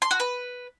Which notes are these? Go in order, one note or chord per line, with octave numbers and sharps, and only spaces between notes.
C6
F#4
B4